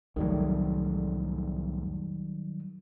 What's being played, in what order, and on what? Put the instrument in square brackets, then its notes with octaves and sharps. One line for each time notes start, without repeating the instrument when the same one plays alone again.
[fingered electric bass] C2 F2 A2 [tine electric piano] D#3 F#3 G3